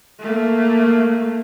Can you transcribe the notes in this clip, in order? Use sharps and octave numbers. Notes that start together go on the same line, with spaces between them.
A3 A#3